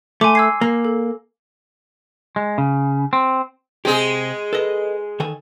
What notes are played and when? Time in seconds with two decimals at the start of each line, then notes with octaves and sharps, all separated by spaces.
0.21 A3 G#5 C6 D6
0.35 E6 G#6 C7
0.61 A#3
0.85 A4
2.36 G#3
2.58 C#3
3.13 C4
3.85 C3 G#3 C4 G4 G#4
4.53 A4 B4 D#5
5.20 D#3 A4 G#5